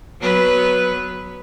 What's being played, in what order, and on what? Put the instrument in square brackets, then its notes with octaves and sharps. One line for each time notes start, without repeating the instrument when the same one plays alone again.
[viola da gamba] F#3 B3 B4